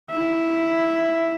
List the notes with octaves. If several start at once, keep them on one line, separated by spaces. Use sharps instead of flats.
E4 E5